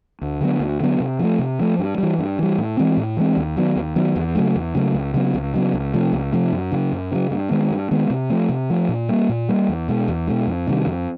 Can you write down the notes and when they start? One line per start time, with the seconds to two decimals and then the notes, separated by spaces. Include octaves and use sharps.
0.22 D2
0.41 D3 F#3 B3
0.60 D2
0.80 D3 F#3 B3
1.00 C3
1.19 F3 A3
1.39 C3
1.59 F3 A3
1.79 G2
1.98 E3 G3
2.19 G2
2.39 E3 G3
2.58 A2
2.77 E3 G#3 C4
2.97 A2
3.17 E3 G#3 C4
3.37 D#2
3.57 D#3 F#3 B3
3.76 D#2
3.96 D#3 F#3 B3
4.16 E2
4.35 C#3 F#3 A3
4.56 E2
4.75 C#3 F#3 A3
4.94 C#2
5.14 C#3 F#3 B3
5.34 C#2
5.54 C#3 F#3 B3
5.74 C#2
5.93 C3 F3 A3
6.13 C#2
6.32 C3 F3 A3
6.52 F#2
6.72 C#3 F#3
6.92 F#2
7.12 C#3 F#3
7.31 G2
7.51 D#3 G#3 B3
7.71 G2
7.91 D#3 G#3 B3
8.10 C3
8.29 F3 A3
8.49 C3
8.70 F3 A3
8.89 A#2
9.09 G3 A#3
9.29 A#2
9.49 G3 A#3
9.69 E2
9.88 B2 G#3
10.08 E2
10.27 B2 G#3
10.47 F2
10.67 C3 D#3 G3
10.86 F2